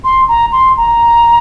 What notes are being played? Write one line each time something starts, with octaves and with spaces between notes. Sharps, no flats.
C6
A#5
C6
A#5